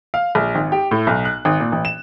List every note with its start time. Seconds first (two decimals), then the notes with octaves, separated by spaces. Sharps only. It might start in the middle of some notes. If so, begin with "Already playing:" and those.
0.14 F5
0.35 A#1
0.55 G#1
0.72 G4
0.91 A2
1.07 B1
1.25 F#6
1.45 G#1
1.60 A#2
1.72 A1
1.85 E7